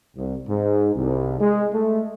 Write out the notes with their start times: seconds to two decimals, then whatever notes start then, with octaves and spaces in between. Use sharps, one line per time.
0.16 C2
0.47 G#2
0.95 C2
1.40 G#3
1.73 A3